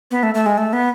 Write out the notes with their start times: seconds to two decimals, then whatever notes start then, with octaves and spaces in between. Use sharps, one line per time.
0.11 B3
0.23 A3
0.34 A3
0.46 G#3
0.58 A3
0.73 B3